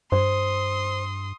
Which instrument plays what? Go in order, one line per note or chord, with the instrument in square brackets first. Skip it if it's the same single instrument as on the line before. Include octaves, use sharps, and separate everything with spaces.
[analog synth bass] G2 [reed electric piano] C5 [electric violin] C6 D#6